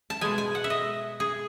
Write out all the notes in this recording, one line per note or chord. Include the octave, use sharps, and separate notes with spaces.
A5
B2 G#3 G#5
G#5
F#5
E5
D#5
G#4